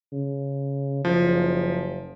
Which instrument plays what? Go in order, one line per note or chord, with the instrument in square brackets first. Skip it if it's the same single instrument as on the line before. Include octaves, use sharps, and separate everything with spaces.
[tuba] C#3
[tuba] F#1 [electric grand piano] F3